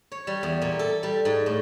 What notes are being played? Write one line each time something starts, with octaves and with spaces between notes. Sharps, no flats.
C#5
G3
E2
A#2
A4
G3
G#2
A2